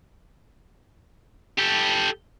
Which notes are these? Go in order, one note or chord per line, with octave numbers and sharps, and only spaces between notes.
G4 A4